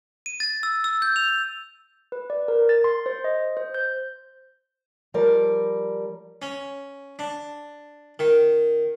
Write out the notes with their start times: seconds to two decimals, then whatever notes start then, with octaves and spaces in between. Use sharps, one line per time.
0.26 D#7
0.40 A6
0.63 E6
0.84 E6
1.02 G6
1.16 F7
2.12 B4
2.30 D5
2.48 A#4
2.69 A6
2.84 C6
3.06 C5
3.24 D#5
3.57 C5
3.74 G6
5.14 F3 G3 A#4 D5
6.42 C#4
7.19 D4
8.19 D#3